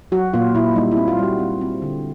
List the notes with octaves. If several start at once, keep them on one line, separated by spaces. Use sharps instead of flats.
F#3 F#4
A#2 F4
A#2 E4
G3 D#4
E4
C4
F4
G3 F#4
C4
C4
D3